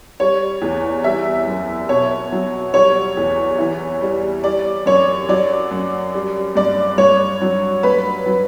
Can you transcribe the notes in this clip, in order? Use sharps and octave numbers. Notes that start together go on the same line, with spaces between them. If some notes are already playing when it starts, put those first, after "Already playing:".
G3 C#5
E2
G3 E5
F#2
B2 C#5
F#3
G3 C#5
E2
E3
G3
G3 D5
F#2 C#5
F#3 D5
F#2
G3
G2 D5
G2 C#5
F#3
G2 B4
F#3